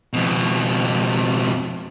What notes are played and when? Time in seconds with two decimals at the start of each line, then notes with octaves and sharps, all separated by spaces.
0.13 F2 B2